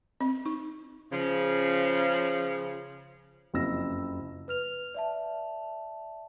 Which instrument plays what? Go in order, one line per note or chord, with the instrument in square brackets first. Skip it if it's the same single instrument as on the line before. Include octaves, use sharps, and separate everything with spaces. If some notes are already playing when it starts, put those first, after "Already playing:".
[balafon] C4
D#4
[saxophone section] C#3 F3
[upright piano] F#1 F2 E4 E6 A#6
[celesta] B4 F6 F7
D5 E5 A5